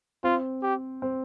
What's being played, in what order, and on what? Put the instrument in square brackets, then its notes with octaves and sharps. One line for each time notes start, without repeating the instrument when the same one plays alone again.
[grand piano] C4 [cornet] F4
[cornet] G4
[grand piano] C4